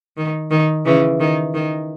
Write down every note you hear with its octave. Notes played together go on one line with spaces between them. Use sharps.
D#3
D#3
C#3 E3
D#3
D#3